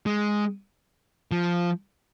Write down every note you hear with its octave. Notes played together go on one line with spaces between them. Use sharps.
G#3
F3